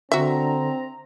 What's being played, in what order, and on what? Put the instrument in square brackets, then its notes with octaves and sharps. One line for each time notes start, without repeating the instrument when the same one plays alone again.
[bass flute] D3 [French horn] C4 [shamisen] F#4 E5 [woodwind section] A#5